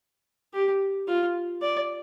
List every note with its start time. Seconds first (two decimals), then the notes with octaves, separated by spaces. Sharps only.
0.54 G4
1.08 F4
1.62 D5